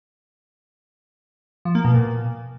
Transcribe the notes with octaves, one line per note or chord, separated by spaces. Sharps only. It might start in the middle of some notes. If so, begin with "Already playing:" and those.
F3
A#3
B2
A#2